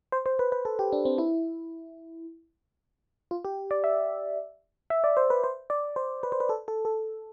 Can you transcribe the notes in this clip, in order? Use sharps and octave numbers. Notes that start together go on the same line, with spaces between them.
C5
C5
B4
B4
A4
G4
D4
C4
E4
F4
G4
D5
E5
E5
D5
C5
B4
C5
D5
C5
B4
C5
B4
A4
A4
A4